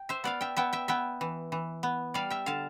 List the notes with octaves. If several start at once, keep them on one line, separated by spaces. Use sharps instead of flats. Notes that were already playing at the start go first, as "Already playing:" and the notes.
Already playing: G5
C5 E5
B3 D5 F5
E5 G5
B3 E5 G5
E5 G5
B3 E5 G5
E3
E3
B3
G3 D5 F5
E5 G5
D3 F5 A5